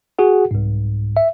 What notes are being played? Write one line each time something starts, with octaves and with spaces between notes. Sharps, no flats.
F#4 G#4 F#5
C2 G#2
E5